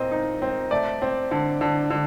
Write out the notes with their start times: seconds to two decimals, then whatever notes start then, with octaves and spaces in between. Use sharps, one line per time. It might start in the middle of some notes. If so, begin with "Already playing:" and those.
Already playing: A#2 C4 D#5
0.12 D#4
0.42 C4
0.71 A3 D5
1.02 C4
1.31 D3
1.61 D3
1.90 D3